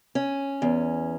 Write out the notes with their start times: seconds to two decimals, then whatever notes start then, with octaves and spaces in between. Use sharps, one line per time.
0.15 C#4
0.62 E2